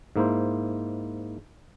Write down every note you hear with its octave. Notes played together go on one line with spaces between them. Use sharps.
G#2 A#3 E4 C5